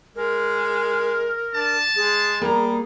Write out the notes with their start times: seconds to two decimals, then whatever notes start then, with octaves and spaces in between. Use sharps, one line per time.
0.16 G#3 A#4
1.55 D4 A5
1.96 G#3 G#4
2.41 G3 A#3 A#5